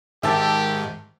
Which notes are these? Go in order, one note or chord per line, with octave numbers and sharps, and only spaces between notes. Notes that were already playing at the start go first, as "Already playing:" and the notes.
G#2 D#3 G4 E5 A5